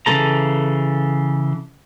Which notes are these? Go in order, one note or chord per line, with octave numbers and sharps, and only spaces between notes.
C#3 E3 A#3 A4 A#5